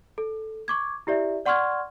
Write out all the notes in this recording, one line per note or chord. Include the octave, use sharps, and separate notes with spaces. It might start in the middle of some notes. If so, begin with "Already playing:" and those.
A4
C#6 D6 G#6
E4 G4 D5 E5
D5 F#5 C6 C#6 F6 G#6